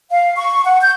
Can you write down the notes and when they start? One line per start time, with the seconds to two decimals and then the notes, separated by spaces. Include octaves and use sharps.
0.11 F5
0.37 C#6
0.65 F#5
0.81 G6